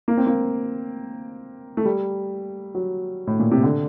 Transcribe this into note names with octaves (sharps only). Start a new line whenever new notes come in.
A#3
C4
A#3
A3
G3
F#3
A2
A#2
C3
D3